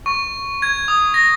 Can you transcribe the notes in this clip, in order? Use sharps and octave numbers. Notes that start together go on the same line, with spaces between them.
C#6
G#6
D#6
A#6